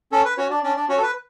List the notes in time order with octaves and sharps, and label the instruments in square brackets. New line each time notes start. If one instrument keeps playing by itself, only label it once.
[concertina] C#4 A4
B4
C#4 F#4 C#5
D4 D5
C#4 D4 D5
D4 D5
C#4 F#4 C#5
A4
B4